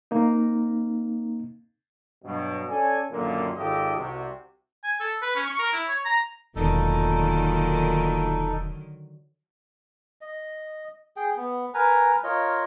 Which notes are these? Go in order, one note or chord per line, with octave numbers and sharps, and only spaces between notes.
A#3 C4 D#4
G2 B2 F#3
C#4 A4 D5 G#5
F#2 A#2 D3 D#3 A#3
G#1 G#2 F4 G4 A4 D#5
C2 C3 F#4
G#5
A4
B4
C#4
C#6
A#4
E4
C#5
A#5
E1 A#2 D3 D#3 F#3 B3 D#4 A4
D#5
G#4 G5
B3
A#4 B4 G#5 A#5
F4 A#4 C#5 D#5